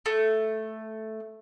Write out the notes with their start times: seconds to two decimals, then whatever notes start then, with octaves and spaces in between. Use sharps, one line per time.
0.06 A3